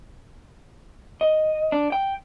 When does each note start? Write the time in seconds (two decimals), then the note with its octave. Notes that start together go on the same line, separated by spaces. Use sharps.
1.21 D#5
1.72 D4
1.92 G5